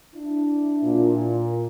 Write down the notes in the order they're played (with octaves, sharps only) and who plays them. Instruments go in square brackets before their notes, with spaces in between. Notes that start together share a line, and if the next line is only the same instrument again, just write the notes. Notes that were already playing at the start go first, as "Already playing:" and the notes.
[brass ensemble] D4 E4
[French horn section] A#2